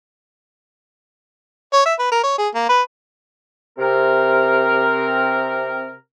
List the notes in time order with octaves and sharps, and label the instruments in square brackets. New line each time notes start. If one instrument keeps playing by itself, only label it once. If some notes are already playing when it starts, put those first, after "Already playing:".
[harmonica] C#5
E5
B4
A#4
C#5
G#4
A#3
B4
[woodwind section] C3 C4 A#4